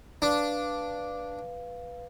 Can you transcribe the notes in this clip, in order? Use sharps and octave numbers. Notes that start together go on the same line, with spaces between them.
D4 B4 F5